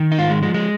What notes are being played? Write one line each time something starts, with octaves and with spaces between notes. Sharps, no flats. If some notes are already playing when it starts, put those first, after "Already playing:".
Already playing: D#3
D#4
G#2 F4
G#3
F3 G#3
G#3